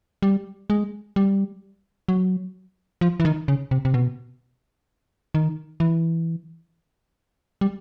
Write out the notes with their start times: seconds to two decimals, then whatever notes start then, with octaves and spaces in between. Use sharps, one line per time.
0.22 G3
0.70 G#3
1.16 G3
2.08 F#3
3.01 F3
3.20 E3
3.25 D#3
3.48 C#3
3.71 C3
3.85 C3
3.94 B2
5.35 D#3
5.80 E3
7.61 G3